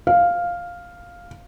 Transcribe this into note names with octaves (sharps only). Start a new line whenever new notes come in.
F5